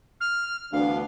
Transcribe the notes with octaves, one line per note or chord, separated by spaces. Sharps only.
F6
D2 E3 B3 D4 F5